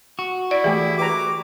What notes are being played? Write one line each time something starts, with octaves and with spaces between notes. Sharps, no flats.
F#4
E4 D5
E3 A3 G4 G#4
G4 B4 A#5 D6